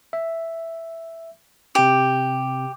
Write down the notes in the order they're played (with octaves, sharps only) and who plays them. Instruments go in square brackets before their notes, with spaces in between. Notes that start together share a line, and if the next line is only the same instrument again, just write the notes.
[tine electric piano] E5
[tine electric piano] C3 G5 [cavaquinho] G4